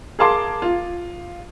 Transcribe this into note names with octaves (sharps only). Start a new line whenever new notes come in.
G#4 A#4 F5 A5 C6 D6
F4